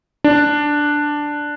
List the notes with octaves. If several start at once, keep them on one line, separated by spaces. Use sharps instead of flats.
D4